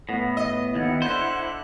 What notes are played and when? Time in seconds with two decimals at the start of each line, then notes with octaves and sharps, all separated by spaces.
0.09 A2 B3
0.37 D#5
0.75 D#2 E4 F#5
1.02 D3 C5 F#6